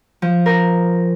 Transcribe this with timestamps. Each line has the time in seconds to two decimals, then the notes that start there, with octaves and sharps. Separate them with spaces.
0.22 F3
0.46 A#4